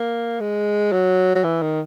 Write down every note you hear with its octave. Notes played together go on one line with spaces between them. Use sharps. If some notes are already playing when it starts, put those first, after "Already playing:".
Already playing: A#3
G#3
F#3
F#3
E3
D#3